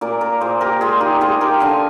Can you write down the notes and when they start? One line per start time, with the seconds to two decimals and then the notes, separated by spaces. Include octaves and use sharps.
0.01 A#2 A#4 D5
0.21 A#4 D5
0.41 A#2 G#4 C5
0.61 G4 A#4
0.81 G#3 F4 G#4
1.01 D#4 G4
1.21 G#3 F4 G#4
1.41 G4 A#4
1.60 D3 F5 G#5